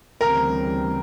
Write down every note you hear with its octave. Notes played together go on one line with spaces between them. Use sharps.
D2 C#3 E3 G3 C4 A#4